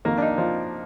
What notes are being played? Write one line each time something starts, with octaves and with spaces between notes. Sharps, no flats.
F2 D#3 A#3
D4
D#4
F3